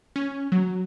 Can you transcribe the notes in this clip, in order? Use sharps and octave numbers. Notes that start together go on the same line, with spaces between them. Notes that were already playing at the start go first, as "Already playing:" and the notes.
C#4
F#3